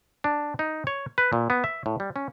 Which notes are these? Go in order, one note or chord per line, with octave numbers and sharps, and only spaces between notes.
D4
D#4
C#5
B4
A#2
B3
E5
A2
G3
C#4